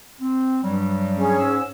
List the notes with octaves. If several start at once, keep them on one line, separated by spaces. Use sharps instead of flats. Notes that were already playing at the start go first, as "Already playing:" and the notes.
C4
G2 F#3 G3
C#4 G#4
G#2 E6